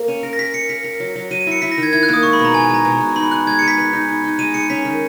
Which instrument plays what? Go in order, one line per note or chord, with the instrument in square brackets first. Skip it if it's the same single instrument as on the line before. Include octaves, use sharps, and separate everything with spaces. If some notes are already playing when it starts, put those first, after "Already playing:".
Already playing: [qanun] A#3
C#4
A#4
[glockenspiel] A#6
[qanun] A#4 [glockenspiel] B6
[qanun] A#4 [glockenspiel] C#7
[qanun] A#4 [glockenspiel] B6
[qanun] A#4
F#3
F#3
[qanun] F#3 [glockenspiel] D#7
[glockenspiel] D#7
[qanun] E4 [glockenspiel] C#7
[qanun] E4 [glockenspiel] B6
[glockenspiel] A#6
[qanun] D#3
[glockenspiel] G#6
[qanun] E4 [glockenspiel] G#6
[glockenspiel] F#6
[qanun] A#3
[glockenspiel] D#6
[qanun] G#3 [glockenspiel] C#6
[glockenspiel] B5
[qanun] B2
[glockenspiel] A#5
[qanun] G#3 [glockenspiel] G#5
[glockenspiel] G#5
[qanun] G#3 [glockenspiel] A#5
[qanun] B2
B2
[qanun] D#4 [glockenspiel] B5
[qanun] D#4 [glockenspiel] F#6
[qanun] G#3 [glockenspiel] G#6
[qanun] G#3 [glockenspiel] C#7
[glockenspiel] B6
[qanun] B4
D#4
D#4
D#4
[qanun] G#3 [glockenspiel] D#7
[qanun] G#4 [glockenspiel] C#7
[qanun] C#4 [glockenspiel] B6
[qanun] D#3